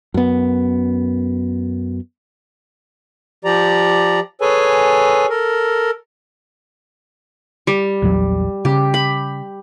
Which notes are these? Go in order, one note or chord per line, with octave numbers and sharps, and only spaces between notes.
F#2 B3
F3 G4 D5 A#5
G#4 A4 B4 C#5 G#5
A4 A#4
G3
A#1 E2 F#3
C#3 G4
B5